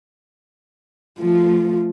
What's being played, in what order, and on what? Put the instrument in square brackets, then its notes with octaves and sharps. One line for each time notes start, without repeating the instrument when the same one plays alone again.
[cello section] F3 A3 [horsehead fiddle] F4